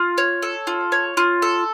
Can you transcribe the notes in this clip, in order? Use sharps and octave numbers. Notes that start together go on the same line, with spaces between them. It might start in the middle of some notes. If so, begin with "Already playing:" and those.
Already playing: F4
C#5
A4
F4
C#5
F4
A4